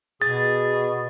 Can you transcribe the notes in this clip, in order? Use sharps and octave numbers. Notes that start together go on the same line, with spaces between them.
B2 G#4 A6